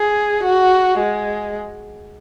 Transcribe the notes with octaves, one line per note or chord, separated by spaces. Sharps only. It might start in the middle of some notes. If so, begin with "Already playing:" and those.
Already playing: G#4
F#4
G#3